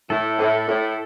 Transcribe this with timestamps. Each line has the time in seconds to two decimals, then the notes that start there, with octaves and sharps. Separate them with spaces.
0.10 A2 A4
0.39 A2
0.68 A2